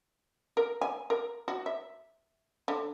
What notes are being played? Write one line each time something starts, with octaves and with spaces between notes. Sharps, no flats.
A#4
G#5
A#4
F#4
E5
D3